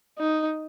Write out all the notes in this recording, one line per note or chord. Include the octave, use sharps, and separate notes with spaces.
D#4